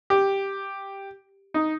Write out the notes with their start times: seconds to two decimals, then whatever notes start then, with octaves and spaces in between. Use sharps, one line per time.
0.10 G4
1.54 D#4